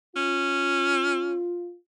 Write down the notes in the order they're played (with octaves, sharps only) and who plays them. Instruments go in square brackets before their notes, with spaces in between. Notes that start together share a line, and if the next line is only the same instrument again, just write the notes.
[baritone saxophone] C#4 [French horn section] F4